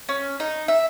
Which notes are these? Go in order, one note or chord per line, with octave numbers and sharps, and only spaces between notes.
C#4
D#4
E5